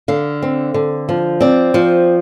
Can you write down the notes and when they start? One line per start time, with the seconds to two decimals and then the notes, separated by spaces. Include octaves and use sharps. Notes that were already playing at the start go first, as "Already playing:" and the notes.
0.08 D3 F5
0.43 C4
0.74 D3
1.09 F3
1.41 C4 D5
1.74 F3